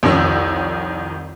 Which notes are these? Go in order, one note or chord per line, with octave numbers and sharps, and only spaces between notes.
C2 F2 D#3 C#5 E6